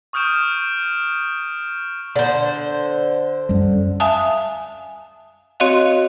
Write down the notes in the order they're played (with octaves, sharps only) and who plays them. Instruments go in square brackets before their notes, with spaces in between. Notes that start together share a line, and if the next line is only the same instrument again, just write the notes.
[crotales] C#6 D#6 F6 G6 D7 E7
[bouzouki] D3 C5
[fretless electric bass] F#2 G3
[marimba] E5 F5 G#5 A5 D#6
C4 F#4 C#5 D#5 F5